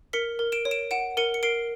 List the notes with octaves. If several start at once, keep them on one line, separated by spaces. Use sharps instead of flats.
A#4 B6 C#7
A#4
D7 E7
C#5
D7 E7
F#5 D7 E7
A#4 C#7 D#7
C#7
A#4 C7 D7